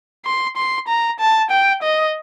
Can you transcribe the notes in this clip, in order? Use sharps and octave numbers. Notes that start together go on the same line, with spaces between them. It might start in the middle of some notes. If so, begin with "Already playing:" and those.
C6
C6
A#5
A5
G5
D#5